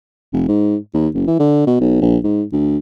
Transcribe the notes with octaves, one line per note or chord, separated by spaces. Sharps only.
F1
G#2
D#2
F#1
E3
D3
B2
B1
A#1
G#2
D2